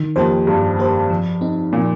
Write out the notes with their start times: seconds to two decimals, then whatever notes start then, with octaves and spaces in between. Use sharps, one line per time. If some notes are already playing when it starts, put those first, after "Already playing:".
Already playing: D#3
0.16 F2 A#3 G4 C5
0.47 G2 D#3
0.79 A#3 G4 C5
1.10 F3
1.41 C4 D#4
1.73 A#2 F3